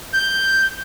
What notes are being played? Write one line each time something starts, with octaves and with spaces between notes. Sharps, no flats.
G6